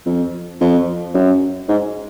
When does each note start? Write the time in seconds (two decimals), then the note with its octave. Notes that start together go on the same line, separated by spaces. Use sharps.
0.06 F2
0.60 F2
1.14 F#2
1.68 G#2